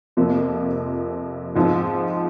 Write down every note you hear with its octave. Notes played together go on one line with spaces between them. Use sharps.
F2 C3 F3 A#3
G#2 F3 C4 D#4